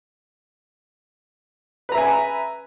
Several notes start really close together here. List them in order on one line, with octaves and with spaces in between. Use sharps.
B4 A#5 E5 G#5